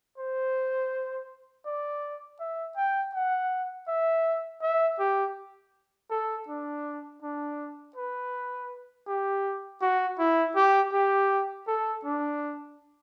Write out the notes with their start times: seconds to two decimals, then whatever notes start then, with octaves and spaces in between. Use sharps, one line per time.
0.18 C5
1.66 D5
2.40 E5
2.76 G5
3.15 F#5
3.88 E5
4.62 E5
4.99 G4
6.10 A4
6.48 D4
7.22 D4
7.96 B4
9.07 G4
9.82 F#4
10.19 E4
10.56 G4
10.93 G4
11.67 A4
12.05 D4